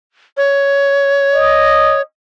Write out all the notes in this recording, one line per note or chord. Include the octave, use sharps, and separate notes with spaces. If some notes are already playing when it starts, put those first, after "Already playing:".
C#5
D#5